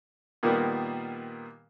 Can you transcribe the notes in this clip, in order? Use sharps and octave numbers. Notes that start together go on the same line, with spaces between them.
A#2 D#3 G3 A#3 B3